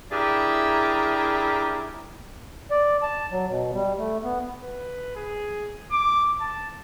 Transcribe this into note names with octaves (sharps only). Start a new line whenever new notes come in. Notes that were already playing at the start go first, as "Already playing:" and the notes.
D4 E4 G4 G#4 A#4 E5
D5
A5
F#3
B2
G3
A3
B3
B4
G#4
D6
A5